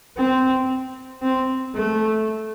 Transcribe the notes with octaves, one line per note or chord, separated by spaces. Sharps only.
C4
C4
A3